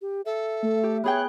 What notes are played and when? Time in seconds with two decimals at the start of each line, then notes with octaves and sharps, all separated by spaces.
0.02 G4
0.26 A4 E5
0.63 A3
0.83 G4
1.04 B3 G#4 C#5 G5 F#6